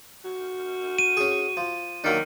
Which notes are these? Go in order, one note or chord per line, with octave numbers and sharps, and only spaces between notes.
F#4
D#7
C#4 G#4
F3
D#3 F#3 A#3 D4